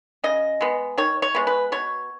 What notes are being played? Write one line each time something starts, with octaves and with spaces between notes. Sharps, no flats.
C#3 D#5
G#3 B3
D#3 C#5
C#5
G#3 B3
B4
B2 C#5